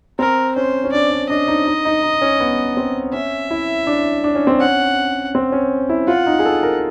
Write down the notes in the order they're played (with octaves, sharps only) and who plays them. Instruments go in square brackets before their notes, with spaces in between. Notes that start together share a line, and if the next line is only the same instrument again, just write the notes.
[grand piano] C4 [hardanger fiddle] A#4
[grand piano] C#4 [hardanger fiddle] C5
[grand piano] C#4
[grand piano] D4 [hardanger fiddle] D5
[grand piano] D4
[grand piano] D4 [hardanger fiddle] D#5
[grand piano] D#4
D#4
D#4
D#4
C#4
B3
C4
[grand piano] C#4 [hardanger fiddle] E5
[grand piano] E4
D4
D4
C#4
C4
[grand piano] C#4 [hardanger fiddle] F#5
[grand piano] C4
C#4
E4
[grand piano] F4 [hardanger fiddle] F#5
[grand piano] D#4
G#4
A4
A#4